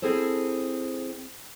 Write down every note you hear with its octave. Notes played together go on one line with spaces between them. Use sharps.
C4 E4 G#4 A4 C5